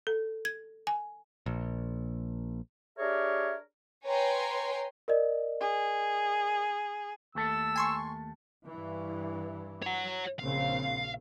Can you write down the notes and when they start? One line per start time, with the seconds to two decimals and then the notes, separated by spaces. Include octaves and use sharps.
0.07 A4
0.45 G#6
0.87 G#5
1.46 A#1
2.98 D4 G4 G#4 A#4 C#5 E5
4.05 B4 C#5 G5 G#5 A#5 C6
5.08 A#4 D5 D#5
5.61 G#4
7.35 D#2 A3 A4 E6
7.76 G#5 C6 C#6
8.65 G2 E3
9.82 C#5 F#5
10.39 A#1 C#3 C4 F5